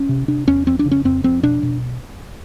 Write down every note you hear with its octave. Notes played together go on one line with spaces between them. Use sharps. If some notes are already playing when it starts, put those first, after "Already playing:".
Already playing: C#4
C3
C3 D4
E2 C#4
F2 C4
D4
C#3
C#4
F2 C4
F2 C4
B2 D4
B2